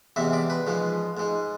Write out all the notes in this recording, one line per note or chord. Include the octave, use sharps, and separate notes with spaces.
E2 C3 E3 G#3 E5
D5
B4
G#2 F3 G#3
G#2 G#3